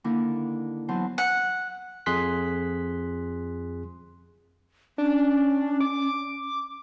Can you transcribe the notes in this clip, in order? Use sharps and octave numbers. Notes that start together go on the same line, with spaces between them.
D3 D#3 A#3 D4 E4
E3 F#3 B3 C5 A5
F#5
F2 G#4 C6 F#6 B6
C#4 D4
D6